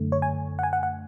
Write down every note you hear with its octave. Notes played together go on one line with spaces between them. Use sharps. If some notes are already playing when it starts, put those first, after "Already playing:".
Already playing: F#2 D3 A3
C#5
G#5
F#5
G#5
F#5
F#5